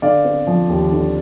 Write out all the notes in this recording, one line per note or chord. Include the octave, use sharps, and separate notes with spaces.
D3 D5 F5
C4
F3
D#2
D3